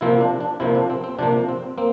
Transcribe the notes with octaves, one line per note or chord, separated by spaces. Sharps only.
C3 F3 A#3 C4 E4
D4
D4
C3 F3 A#3 C4 E4
D4
C4
C4
C3 F3 A#3 D4
C4
A#3 C4